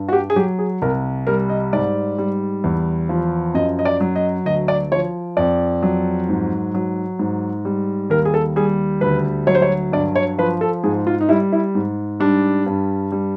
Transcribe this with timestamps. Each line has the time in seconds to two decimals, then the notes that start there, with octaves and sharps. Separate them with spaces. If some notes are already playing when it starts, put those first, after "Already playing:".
Already playing: G2
0.09 F#4
0.13 G4
0.30 G#4
0.36 F#3 G4
0.59 G#4
0.82 C2 A#4
1.27 G3 A#4
1.49 D#5
1.73 G#2 D5
2.18 G3
2.64 E2
3.09 F3
3.54 F#2 D#5
3.79 D#5
3.85 D5
4.00 F#3
4.16 D#5
4.46 D2 D#5
4.68 D5
4.91 F3 C#5
5.37 F2 D5
5.82 F#3
6.29 G#2
6.74 F#3
7.19 G#2
7.65 G3
8.10 D#2 A#4
8.25 G#4
8.34 A4
8.56 G3 G#4
9.01 D2 B4
9.47 F#3 C#5
9.55 C5
9.62 C#5
9.92 G2 D5
10.15 C#5
10.38 F3 B4
10.61 A4
10.84 G#2 G#4
11.07 F4
11.21 D#4
11.29 G3 E4
11.52 E4
11.75 G#2
12.20 G3 D4
12.66 G2
13.12 G3